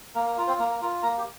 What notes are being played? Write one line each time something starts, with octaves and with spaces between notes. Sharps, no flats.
A#3 A#4
A#4
F4 A#4
C4 C5
A#3 A#4
A#4
F4 A#4
A#3 A#4 A#5
G4